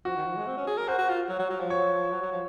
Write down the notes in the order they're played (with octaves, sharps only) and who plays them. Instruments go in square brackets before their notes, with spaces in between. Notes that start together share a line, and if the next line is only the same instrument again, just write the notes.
[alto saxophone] F3 [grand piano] F#4
[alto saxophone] D#3
F3
G#3
C4
C#4
G#4
A#4
[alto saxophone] F#4 [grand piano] C5
[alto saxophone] F#4
F4
F#3
F#3
F#3
F3
[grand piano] C#5
[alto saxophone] F#3
F#3
F3